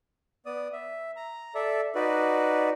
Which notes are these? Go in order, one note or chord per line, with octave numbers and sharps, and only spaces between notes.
B3 D5 D#6
E5
A#5
A4 D5 E5
D#4 F#4 B4 D5